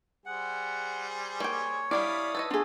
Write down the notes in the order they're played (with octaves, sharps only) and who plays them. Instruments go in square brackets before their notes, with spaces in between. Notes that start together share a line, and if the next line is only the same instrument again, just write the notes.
[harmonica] G3 G#4 C5 [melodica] F#5
[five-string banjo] A#3 G5 [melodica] C#5
[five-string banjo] G3 D4 D5 [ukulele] E4 [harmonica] F5 B5 D#6
[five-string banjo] A4 B4 D#5
[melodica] A3 B3 [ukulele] D4 G#4 [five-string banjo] F4 A4